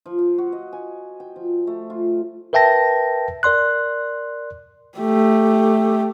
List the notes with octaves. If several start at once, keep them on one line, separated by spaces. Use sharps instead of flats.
F3
F5
F#4
D#5
G#5
G5
F3
A3
F4
A#4 B4 E5 G5 A5 A#6
A#4 D5 C6 F#6
A3 G4